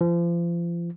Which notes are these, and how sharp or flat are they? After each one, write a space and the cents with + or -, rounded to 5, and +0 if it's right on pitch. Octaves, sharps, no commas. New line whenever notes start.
F3 -35